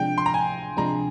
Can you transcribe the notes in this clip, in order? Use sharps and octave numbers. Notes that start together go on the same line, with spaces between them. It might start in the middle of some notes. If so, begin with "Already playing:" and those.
Already playing: C3 F3 G#3 D4 G5
C6
A#5
G#5
C3 F3 G#3 D4 A#5